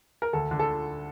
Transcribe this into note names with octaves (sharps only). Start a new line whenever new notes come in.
A#4
D2 A4
D3
A4